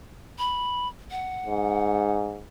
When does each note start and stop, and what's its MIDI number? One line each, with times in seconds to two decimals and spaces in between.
0.39 0.88 83
1.11 2.14 78
1.46 2.42 44